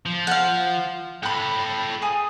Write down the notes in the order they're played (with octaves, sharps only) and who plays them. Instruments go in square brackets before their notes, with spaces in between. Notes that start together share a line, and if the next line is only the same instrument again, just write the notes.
[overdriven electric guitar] F3
[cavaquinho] F5 F#5
[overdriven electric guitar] A4 G5 [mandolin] B5 F#6
[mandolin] G#4 G#5